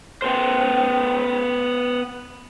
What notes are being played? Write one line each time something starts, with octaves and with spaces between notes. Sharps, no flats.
B3 C5